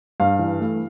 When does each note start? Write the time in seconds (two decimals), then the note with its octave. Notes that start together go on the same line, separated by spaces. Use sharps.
0.20 G2 F5
0.39 E3
0.60 A3